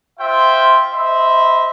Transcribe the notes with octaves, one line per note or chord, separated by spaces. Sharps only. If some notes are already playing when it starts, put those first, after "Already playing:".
F4 C5 E5 G5
C5 D#5 E5 B5